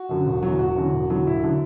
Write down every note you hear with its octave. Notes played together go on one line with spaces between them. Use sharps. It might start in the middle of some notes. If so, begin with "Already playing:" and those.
Already playing: F#4
F#2 D3 F#3
E1
E2 D3 F#3
E1 F#4
E2 D3 F#3
E1
E2 D3 F#3
E1 E4
D3 F#3